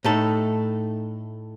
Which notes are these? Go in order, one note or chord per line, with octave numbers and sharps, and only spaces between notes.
A2 A3 D#4 A4